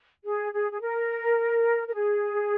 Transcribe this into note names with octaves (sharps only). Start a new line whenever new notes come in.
G#4
G#4
G#4
A#4
A#4
G#4